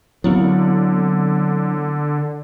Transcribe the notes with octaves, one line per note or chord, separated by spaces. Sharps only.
D3 F#3 B3 C4 E4